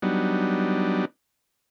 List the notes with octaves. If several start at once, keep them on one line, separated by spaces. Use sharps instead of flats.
F#3 G3 B3 D4 D#4